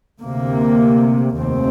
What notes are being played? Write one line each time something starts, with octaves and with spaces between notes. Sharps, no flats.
D2 C3 A#3
F1 D#2 C4